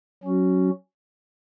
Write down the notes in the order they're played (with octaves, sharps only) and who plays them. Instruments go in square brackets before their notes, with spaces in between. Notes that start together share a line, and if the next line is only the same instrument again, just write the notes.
[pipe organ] F#3 C#4 F#4